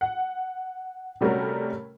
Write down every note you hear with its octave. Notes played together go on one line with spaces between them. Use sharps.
F#5
C3 G3 A3 C#4 F#4 A#4